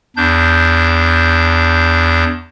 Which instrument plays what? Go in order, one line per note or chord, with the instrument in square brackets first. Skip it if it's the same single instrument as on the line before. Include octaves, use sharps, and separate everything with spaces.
[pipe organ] E2 D4 G6